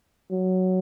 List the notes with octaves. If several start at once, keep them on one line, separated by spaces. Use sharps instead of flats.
F#3